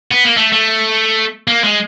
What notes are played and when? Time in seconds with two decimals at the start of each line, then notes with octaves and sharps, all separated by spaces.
0.11 B3
0.24 A#3
0.37 A3
0.52 A3
1.48 A#3
1.64 G#3